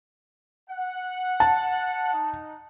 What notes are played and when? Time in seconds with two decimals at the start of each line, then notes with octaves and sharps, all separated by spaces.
0.69 F#5
1.40 A5
2.13 D#4